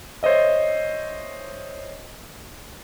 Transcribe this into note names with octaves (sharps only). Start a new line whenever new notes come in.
C5 C#5 D#5 E5